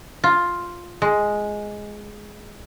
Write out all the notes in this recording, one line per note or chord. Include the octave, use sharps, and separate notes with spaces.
F4
G#3